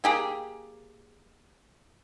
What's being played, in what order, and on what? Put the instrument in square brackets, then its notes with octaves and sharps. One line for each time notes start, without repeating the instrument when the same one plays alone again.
[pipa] A#3 G4 G#4